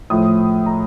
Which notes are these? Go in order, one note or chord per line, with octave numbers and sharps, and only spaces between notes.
A2 F3 A3 D#6
A#5